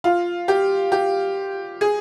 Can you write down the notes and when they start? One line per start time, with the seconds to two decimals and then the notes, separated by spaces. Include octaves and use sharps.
0.04 F4
0.48 G4
0.92 G4
1.81 G#4